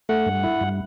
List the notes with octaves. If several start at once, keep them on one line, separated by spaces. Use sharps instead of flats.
A3 F#5
G2
E4
G2